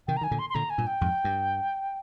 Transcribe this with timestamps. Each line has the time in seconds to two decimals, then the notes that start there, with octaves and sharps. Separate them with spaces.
0.08 C3 D#3 G5
0.17 A#5
0.21 D#3 G#5
0.31 A#2 D3
0.39 C6
0.50 C6
0.55 A#2 D3 A#5
0.70 G#5
0.78 G2 A#2
0.87 G5
1.01 F2 G#2
1.24 G2